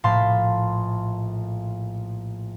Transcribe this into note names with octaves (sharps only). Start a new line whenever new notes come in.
A#1 A2 F5 A5 B5 C6